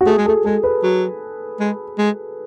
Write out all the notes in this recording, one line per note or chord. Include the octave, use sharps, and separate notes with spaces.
F#4
A3 G#4
G#3
A3 A4
G#3 A4
B4
F#3
G#3
G#3